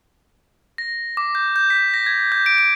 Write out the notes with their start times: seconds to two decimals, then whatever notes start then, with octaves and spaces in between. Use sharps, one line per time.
0.78 A#6
1.17 D6
1.35 G6
1.56 G6
1.70 B6
1.94 A#6
2.06 G#6
2.32 G6
2.46 D7
2.58 D7